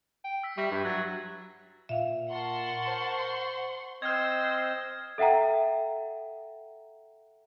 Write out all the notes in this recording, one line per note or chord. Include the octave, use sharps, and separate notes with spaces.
G5
E6 B6
G3 E5 C#6 A#6 B6
G2 E4
F#3 F#6 G#6 A6
A#2 E5 F5
A#4 F#5 A5 C6 C#6
C5
C4 C5 D#5 E6 F6 G#6
A4 E5 F#5 G5 A#5